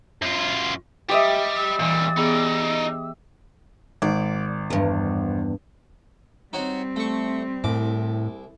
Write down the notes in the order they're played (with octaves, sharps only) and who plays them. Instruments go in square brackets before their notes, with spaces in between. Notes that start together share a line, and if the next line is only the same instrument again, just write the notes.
[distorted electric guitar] F#2 F4
[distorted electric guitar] G3 [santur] G4 D#5 E5
[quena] E6
[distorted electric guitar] A#2 G3 [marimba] E3
[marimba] B3 G#4 [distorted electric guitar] D#4 D5
[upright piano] G#1 [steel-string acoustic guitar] D5
[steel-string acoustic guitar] E2 G2
[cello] G3 C4 [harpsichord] D#4 F#4 C#5
[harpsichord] A3 C#6
[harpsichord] C2 D6 [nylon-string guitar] A2